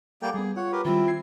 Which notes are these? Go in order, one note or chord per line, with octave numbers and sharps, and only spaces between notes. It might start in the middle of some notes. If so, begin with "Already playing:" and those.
G3 A#3 A4 F#5 G5 D6
G3 B3 G#4
F4 C#5 F#5
G4 A#4 B4
D#3 G3 C4 E4 F4
G#6 C7